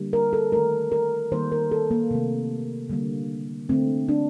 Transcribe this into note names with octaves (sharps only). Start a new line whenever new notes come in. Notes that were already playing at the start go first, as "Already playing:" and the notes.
Already playing: D3 G3 A#3
A#4
A4
D#3 A3 A#4
A#4
D#3 G3 A#3 C5
A#4
A4
A#3
C3 D#3 A3
D3 G3 A#3
D3 A3 C4
D4